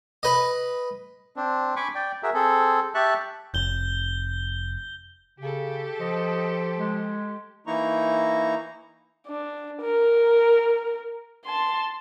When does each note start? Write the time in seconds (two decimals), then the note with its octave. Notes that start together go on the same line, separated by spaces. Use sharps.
0.23 B4 D#5
1.36 C4 D4
1.76 G#5 B5 C#6 D6
1.95 D5 G5
2.23 F#4 G#4 A#4 E5
2.34 C4 G#4 A4
2.95 G4 E5 A5 C#6 F#6
3.54 F1 G6 G7
5.39 C#3 G4 A4
6.00 F3 D#5
6.79 G#3
7.67 E3 A#3 D#4 E4 A#5 C#6
9.27 D4
9.82 A#4
11.45 A5 C6